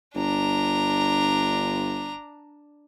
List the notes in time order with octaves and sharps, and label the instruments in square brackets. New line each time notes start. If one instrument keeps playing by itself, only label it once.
[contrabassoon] G1 [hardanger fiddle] D4 A#5